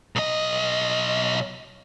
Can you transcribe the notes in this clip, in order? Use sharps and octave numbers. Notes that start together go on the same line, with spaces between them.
B1 D#5